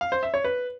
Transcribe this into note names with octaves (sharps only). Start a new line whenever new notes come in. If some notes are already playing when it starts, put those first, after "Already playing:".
F5
C5
E5
C#5
B4